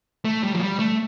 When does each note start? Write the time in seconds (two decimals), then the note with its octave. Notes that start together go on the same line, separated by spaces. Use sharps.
0.25 A3
0.43 G3
0.53 F3
0.60 G3
0.79 A3